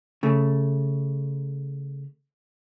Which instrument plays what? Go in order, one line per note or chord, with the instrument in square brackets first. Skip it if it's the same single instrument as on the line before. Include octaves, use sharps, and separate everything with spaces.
[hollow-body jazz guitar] C#3 A3